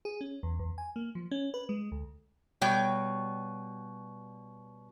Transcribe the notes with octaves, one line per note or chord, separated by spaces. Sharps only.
G#4
C#4
E2
E2
G#5
A#3
F3
C#4
B4
G#3
D2
B2 G3 C#5 G5